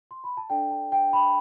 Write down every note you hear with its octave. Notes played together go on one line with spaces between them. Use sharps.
C6
B5
A5
D4 A4 D5 G5
A5
G5
B5